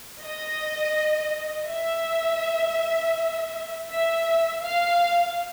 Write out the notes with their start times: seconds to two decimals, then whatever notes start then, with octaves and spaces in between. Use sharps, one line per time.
0.21 D#5
1.69 E5
3.89 E5
4.63 F5